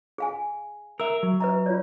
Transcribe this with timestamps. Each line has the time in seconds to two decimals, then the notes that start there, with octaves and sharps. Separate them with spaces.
0.18 G#4 F5 G#5
1.00 A#4 E5 E6
1.23 F#3
1.40 B4 E5 A#5
1.66 F4 C#5 D5